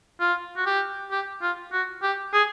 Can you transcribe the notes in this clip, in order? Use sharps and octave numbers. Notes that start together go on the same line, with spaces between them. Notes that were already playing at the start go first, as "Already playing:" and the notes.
F4
F#4
G4
G4
F4
F#4
G4
G#4